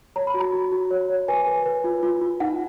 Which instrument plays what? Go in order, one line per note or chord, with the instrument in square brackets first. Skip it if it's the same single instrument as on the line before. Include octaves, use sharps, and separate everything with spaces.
[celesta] C#5 A#5
B5
F#4
A#5
F#4
F#4
C#5
C#5
B4 G#5
B4
B4
F4
F4
F4
D#4 F#5